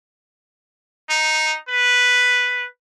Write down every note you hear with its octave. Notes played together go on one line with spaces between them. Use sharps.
D#4
B4